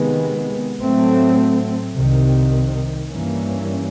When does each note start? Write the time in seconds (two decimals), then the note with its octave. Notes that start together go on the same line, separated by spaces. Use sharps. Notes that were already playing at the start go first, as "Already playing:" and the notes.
Already playing: C3 D#3 G#3 B3
0.81 A2 F#3 A3 C4
1.95 C2 C3 D#3
3.08 G2 E3 G3 A#3 C#4